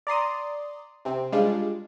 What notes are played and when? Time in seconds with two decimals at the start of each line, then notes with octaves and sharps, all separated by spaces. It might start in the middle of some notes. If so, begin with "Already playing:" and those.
0.07 D5 A#5 C6 D#6
1.05 C3 C4
1.32 G3 G#3 D4 F4